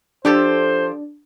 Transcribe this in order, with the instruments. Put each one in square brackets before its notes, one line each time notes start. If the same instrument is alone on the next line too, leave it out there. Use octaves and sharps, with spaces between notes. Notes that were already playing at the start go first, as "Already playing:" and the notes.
[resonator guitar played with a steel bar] F3 G4 A4 [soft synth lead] D4 [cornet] C5